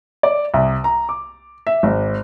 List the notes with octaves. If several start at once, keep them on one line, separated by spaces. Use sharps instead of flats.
D5
C2
A#5
D6
E5
G#1